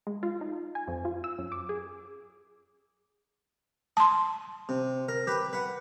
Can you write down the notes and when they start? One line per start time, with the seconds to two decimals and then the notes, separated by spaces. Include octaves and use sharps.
0.07 G#3
0.23 F4
0.41 D#4
0.75 G#5
0.88 F2
1.05 F4
1.24 E6
1.38 F#2
1.52 D6
1.69 G#4
3.97 A5 C6 D#6
4.69 C3
5.09 A#4
5.27 G4 B4
5.53 B4 F#5